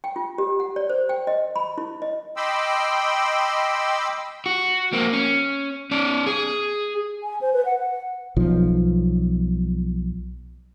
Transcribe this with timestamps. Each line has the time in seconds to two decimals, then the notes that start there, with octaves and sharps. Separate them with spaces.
0.04 G5
0.16 F4
0.38 G4
0.60 F#5
0.76 D5
0.90 C5
1.09 G5
1.27 D#5
1.56 B5
1.78 E4
2.02 D#5
2.37 D#5 G5 B5 C6 D6 E6
4.46 F#4
4.93 A#3 C4
5.13 C#4
5.91 C#4 D5
6.27 G#4
7.23 G#5
7.41 C5
7.53 B4
7.65 F#5
7.79 F#5
8.36 B1 F3